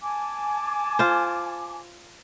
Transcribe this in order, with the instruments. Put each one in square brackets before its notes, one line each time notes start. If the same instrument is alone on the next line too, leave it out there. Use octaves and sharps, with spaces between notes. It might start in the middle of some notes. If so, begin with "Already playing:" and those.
[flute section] G#5 A5 D6
[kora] F4 C5